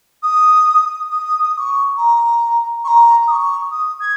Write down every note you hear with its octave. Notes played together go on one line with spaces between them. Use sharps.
D#6
D#6
D#6
D#6
C#6
A#5
C#6
A#5
D#6
C#6
D#6
G#6